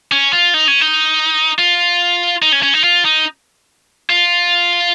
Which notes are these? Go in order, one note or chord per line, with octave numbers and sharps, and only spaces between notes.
C#4
F4
D#4
C#4
D#4
F4
D#4
C#4
C#4
D#4
F4
D#4
F4